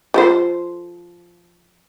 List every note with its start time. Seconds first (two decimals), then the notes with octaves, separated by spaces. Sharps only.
0.14 F3 A4 C5